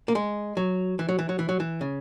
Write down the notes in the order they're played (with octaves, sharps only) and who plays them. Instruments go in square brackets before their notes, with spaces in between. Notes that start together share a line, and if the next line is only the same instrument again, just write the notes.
[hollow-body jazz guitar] A#3
G#3
F#3
E3
F#3
E3
F#3
E3
F#3
E3
C#3